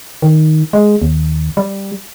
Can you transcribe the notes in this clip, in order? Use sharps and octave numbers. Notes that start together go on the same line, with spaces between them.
D#3
G#3
D#2
G3